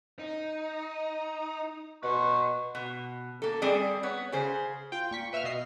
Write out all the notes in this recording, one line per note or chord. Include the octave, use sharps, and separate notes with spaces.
D#4
B2 B4 C6 C#6
B2
A#3 A4
G3 C4 G#4 D5
B3 C#5
C#3 G#4 C5
F4 G5
A#2 C#6 B6
B4 E5 F5 E6 F6
B2 D#5 C7